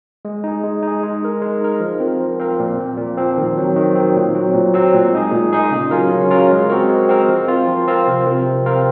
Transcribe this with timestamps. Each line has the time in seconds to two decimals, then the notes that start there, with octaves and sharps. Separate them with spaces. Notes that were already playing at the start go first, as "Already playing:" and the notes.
0.25 G#3
0.44 D#4 G#4
0.64 G#3
0.83 D#4 G#4
1.03 G#3
1.22 D#4 A#4
1.42 G#3
1.61 D#4 A#4
1.80 F3
2.00 C4 F4 A#4
2.20 F3
2.40 C4 F4 A#4
2.60 A#2
2.78 F3 C4
2.98 A#2
3.17 F3 C4
3.38 D#3
3.57 F#3 C4
3.76 D#3
3.95 F#3 C4
4.15 A#2
4.35 F#3 C4
4.54 A#2
4.74 F#3 C4
4.94 A#2
5.13 G#3 D#4 G#4
5.32 A#2
5.53 G#3 D#4 G#4
5.72 C#3
5.91 F#3 C#4 F4 A#4
6.11 C#3
6.31 F#3 C#4 F4 A#4
6.51 G#3
6.70 C4 F#4 A#4
6.89 G#3
7.09 C4 F#4 A#4
7.29 F3
7.48 C4 F4 A#4
7.68 F3
7.87 C4 F4 A#4
8.07 C3
8.26 F3 C4 F4 A#4
8.46 C3
8.66 F3 C4 F4 A#4